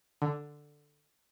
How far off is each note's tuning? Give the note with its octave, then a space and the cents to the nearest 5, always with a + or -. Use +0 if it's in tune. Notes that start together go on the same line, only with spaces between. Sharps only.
D3 +5